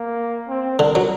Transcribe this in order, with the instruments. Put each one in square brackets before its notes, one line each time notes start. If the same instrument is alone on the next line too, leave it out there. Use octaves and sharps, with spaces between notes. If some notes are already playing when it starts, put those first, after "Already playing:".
Already playing: [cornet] A#3
C4
[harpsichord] D3 [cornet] A#4
[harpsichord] F#3